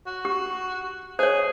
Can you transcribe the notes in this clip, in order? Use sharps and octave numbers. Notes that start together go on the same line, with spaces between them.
F#4
G4
G#4 C5 C#5